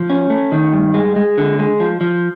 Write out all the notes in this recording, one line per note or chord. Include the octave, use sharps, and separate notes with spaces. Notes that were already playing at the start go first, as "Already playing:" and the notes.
Already playing: F3
C#4
A3
D#3
G2
G#3
G#3
D3
G#3
F3
F3